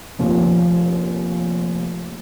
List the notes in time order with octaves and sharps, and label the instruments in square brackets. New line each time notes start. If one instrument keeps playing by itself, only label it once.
[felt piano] F1 D#2 F3 C#4 F4